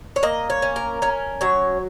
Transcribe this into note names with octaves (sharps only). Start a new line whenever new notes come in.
C#5
A#3 D#5
C#5
C#4
A#4
C#4 A#4
F#3 C#5